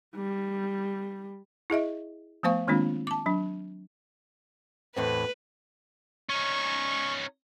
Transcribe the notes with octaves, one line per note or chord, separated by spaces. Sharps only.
G3
E4 G#4 D#5 E5
F3 A3 B3 C5 F5 C#6
D#3 G#3 A#3 C4 D4 F4
A5 D6
F#3 D4
E2 A2 C4 B4
C#4 D#4 C#6